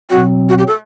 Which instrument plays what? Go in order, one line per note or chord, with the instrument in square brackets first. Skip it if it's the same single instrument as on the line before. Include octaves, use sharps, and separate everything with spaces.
[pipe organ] B2 F#3 C4 [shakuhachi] F#4
[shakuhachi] F#4
G4
A4